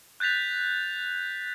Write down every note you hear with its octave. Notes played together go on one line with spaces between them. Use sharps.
F#6 G6 A6 B6 F7